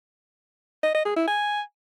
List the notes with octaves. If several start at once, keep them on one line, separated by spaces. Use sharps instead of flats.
D#5
D#5
G#4
E4
G#5